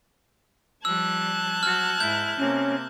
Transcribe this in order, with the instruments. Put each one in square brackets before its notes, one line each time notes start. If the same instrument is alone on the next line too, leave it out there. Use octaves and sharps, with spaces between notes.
[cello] F3 G3 [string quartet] A5 F#6 G#6 [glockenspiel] E6
[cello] F#3 F#4 [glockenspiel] F6
[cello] G#2 E4 [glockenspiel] G6
[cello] C3 A#3 [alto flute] C#4